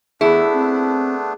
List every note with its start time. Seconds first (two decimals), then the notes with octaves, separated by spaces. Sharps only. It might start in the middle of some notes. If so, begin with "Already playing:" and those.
0.21 E2 A3 B3 D4 E4 G#4
0.54 C4